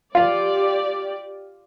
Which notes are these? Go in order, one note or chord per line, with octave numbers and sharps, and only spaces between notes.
F4 G4 D5 F5